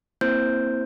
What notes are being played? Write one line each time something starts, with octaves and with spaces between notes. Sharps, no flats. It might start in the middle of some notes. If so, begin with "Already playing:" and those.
A#3 C4 E4 C5 G6